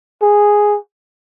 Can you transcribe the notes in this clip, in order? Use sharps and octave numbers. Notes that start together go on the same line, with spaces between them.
G#4